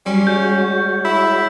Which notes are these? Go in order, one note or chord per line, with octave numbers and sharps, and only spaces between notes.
F#3 G3 C#4 C6 D6
G#3 F#4 C#5 G6
E4